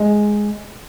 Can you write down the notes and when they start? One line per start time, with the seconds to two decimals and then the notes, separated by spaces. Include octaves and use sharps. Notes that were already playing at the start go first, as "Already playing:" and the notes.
Already playing: G#3